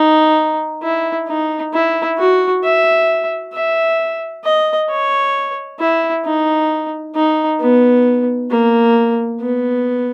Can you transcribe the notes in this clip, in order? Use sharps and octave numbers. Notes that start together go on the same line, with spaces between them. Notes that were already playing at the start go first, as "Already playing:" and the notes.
Already playing: D#4
E4
D#4
E4
F#4
E5
E5
D#5
C#5
E4
D#4
D#4
B3
A#3
B3